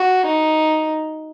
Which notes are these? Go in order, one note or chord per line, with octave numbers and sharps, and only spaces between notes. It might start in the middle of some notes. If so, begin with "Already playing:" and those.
Already playing: F#4
D#4